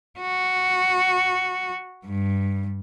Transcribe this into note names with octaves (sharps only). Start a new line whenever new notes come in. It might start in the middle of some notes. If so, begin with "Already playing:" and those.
F#4
G2